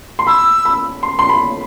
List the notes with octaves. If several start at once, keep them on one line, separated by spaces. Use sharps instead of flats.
C6
B5 E6
B5
C6
C6
B5